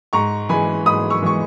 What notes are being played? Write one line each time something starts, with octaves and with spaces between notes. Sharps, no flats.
G#2 A#5 C#6
E3 G#3 G#5 B5
G#2 B5 D#6
C#6 E6
E3 G#3 C#6